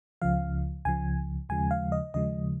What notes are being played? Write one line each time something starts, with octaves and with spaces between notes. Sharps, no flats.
C#2 C#3 F3 F5
C#2 C#3 F3 G#5
D#2 C#3 F3 G#3 G#5
F5
D#5
D#2 C#3 F3 G#3 D#5